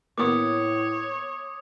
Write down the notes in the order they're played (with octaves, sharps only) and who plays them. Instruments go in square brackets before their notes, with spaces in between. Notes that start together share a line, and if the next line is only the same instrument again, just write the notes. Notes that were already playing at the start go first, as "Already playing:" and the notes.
[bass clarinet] A2 [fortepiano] A#3 B3 [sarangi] C#5 [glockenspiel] D6 D#6